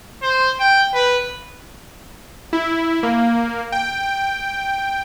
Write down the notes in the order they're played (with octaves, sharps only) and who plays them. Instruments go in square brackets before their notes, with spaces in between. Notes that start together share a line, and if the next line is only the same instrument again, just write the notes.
[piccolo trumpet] C5
G5
B4
[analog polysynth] E4
A#3
G5